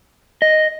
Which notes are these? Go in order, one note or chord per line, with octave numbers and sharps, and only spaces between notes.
D#5